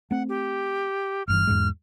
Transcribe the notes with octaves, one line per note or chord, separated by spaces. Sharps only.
A3 C4 F#5
G4
G1 G2 E3 F6
E2 G#2 G#3